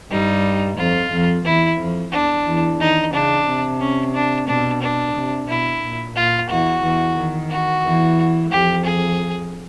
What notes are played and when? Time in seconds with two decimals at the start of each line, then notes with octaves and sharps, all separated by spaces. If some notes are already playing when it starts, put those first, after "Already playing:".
0.11 G2 G3 D#4
0.77 F2 F3 F4
1.11 F2 F3
1.45 E2 E3 E4
1.79 F2 F3
2.12 E2 E3 D4
2.46 E2 E3
2.80 D#3 D#4
3.13 C#3 D4
3.47 C3
3.80 C#4
4.14 D4
4.47 B2 D4
4.82 D4
5.15 C3
5.48 B2 E4
5.83 A#2
6.16 A#2 F4
6.49 E2 E3 F#4
6.83 E2 E3
7.17 D#3
7.50 F#4
7.84 E2 E3
8.51 F2 F3 G4
8.85 G#4